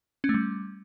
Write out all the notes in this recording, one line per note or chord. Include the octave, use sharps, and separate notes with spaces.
C#4
A3
G3